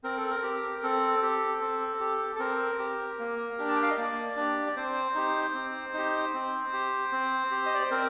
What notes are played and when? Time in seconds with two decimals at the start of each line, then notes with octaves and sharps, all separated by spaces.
0.04 C4 A#4
0.17 A4
0.30 A#4
0.43 G4
0.83 C4 A4
1.22 G4
1.61 C4
2.00 G4
2.36 A4
2.40 C4 A#4
2.79 G4
3.19 A#3
3.58 D4 G4
3.69 A5
3.76 G5
3.82 F5
3.89 D#5
3.97 A#3 D5
4.36 D4 G4
4.66 D5
4.76 C4 C5
5.15 D#4 G4
5.54 C4
5.94 D#4 G4
6.34 C4
6.73 G4
7.12 C4
7.51 G4
7.66 D#5
7.75 D5
7.82 C5
7.91 C4 A#4